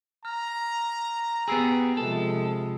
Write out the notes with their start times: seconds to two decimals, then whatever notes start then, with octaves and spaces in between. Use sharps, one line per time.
0.25 A#5 F6
1.48 B3 G4 G#4 B5 E6 C7
1.97 C3 F3 G#3 A4